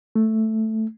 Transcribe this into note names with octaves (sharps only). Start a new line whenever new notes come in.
A3